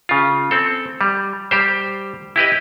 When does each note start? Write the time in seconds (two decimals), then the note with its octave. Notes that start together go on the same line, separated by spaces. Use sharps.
0.09 C#3 F4
0.51 C4 A4
1.01 G3
1.51 G3 G4 C5
2.36 E4 G4 B4 D#5